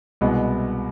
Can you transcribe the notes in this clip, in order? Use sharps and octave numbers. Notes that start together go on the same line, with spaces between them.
C2 B2 G#3 B3 E4